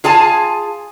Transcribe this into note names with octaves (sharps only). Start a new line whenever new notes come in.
F4 G#4 G#5 A5